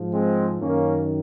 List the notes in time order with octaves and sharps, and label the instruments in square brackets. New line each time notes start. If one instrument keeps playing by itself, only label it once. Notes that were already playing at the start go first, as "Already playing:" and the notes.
Already playing: [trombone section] G#2 F3
G#3 C4
F#2 D#3 A#3 C#4